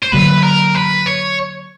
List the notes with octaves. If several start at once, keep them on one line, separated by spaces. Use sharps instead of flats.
C5
D3 F#3 A#3 B4
A#4
B4
C#5